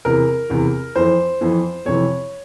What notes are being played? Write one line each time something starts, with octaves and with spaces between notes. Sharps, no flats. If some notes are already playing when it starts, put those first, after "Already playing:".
E2 C3 E3 A#4
E2 C3 E3
F2 E3 C5
F2 E3
F2 C3 E3 C#5